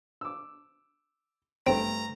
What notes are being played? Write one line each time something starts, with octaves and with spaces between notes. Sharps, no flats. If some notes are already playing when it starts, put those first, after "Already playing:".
D6 E6
G2 A3 C4 A#5